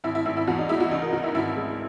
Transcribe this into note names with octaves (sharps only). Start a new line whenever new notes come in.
G#1 E4
E4
G#1 E4
E4
E2 F#4
D#4
G#3 E4
F#4
C#2 D#4
A#4
C#2 F#4
E4
G#1 E4
G#3